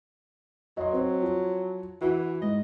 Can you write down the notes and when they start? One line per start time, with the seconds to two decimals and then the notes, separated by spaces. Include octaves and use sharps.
0.77 F#3 D#5 C6
0.93 C4 C5
1.22 F3
2.01 E3 F#4
2.42 G#2 D#5